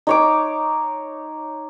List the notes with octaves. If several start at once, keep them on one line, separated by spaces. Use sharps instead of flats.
D#4 C#5 D6